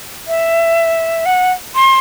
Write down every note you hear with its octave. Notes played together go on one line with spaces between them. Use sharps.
E5
F#5
C6